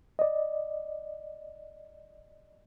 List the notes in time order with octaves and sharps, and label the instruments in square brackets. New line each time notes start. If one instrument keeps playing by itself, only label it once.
[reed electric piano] D5 D#5